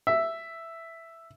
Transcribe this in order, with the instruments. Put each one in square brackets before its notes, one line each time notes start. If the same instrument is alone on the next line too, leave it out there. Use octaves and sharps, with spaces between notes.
[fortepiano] E5